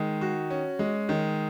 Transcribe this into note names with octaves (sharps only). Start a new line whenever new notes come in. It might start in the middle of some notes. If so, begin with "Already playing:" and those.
Already playing: D#3 G#3
F#4
C#4
G#3
D#3